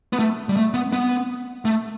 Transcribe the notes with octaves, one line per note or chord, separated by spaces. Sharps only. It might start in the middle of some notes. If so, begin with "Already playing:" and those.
B3
A3
G3
A3
B3
B3
A3